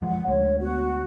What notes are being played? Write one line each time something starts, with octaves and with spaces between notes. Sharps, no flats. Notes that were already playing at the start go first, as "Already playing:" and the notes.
F#2 F3 G#3 F#5
D2 G#3 C#5
B3 F#4